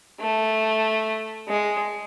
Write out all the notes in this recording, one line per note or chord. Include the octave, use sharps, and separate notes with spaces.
A3
G#3